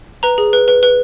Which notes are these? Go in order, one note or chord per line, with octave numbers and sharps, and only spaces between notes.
B4 A#5
G#4
B4
B4
B4